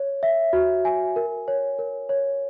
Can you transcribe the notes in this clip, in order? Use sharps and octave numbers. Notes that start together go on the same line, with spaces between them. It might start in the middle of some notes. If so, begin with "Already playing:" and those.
Already playing: C#5
E5
F#4
G#5
A#4
C#5
A#4
C#5